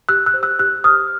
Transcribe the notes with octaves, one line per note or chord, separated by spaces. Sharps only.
G4 E6 F#6
E6 F#6
C5
E6 F#6
G4 E6 F#6
C5 D#6 F6